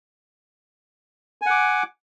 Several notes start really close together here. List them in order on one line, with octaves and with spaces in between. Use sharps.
G#5 F#5 D6